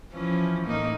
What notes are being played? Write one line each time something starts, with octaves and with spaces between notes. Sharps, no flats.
E3 F3 C#4
A2 A#3 D#4